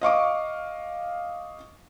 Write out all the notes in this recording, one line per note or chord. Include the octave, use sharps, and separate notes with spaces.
D#5 F5 C#6 D6